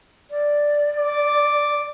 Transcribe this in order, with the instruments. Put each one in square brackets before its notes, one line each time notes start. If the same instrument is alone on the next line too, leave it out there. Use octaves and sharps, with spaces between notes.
[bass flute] D5
[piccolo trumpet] D6